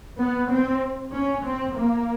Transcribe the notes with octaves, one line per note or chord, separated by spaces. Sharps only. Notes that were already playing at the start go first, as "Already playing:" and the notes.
B3
C4
C#4
C4
A#3